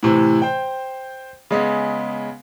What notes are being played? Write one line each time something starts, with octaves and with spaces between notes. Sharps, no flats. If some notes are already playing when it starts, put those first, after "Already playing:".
A2 C3 E3
C5 G5
C#3 G#3 B3